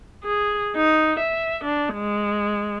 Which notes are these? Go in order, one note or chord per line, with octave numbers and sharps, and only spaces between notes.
G#4
D#4
E5
D4
G#3